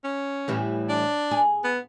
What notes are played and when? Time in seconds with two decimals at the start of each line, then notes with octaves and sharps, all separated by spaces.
0.04 C#4
0.48 A2 E3 G3
0.89 D4
1.31 G#4
1.64 B3